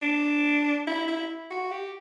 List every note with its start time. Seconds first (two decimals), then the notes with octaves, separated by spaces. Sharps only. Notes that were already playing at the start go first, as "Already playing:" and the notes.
0.02 D4
0.87 E4
1.08 E4
1.51 F#4
1.71 G4